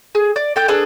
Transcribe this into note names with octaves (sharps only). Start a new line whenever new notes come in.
G#4
D5
A4 G5 G6
D4 G#4 A4 B4